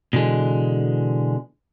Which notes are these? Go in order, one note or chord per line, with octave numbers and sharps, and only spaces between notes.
B2 D3 E3 G#3